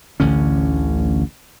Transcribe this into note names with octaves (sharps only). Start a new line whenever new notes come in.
A1 D2 D3 C#4